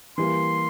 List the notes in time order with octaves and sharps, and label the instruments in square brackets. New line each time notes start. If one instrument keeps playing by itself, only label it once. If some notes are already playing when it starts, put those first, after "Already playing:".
[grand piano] E3 G3 A#3 [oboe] C6